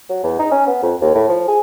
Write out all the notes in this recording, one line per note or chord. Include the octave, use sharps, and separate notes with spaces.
F#3
E2
D#4
C#4
B3
F2
D#2
A2
F3
G#4